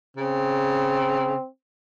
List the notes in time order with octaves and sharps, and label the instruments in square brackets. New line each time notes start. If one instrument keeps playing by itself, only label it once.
[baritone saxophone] C#3 [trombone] C4